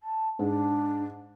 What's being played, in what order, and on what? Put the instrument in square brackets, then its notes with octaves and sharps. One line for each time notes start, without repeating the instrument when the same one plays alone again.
[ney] A5
[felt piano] G#2 [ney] D4